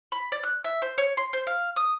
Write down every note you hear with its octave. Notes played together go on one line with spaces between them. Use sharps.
B5
D5
F#6
E5
C5
C#5
C6
C5
F5
D#6